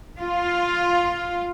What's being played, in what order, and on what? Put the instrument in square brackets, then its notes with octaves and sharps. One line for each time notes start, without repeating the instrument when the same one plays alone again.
[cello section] F4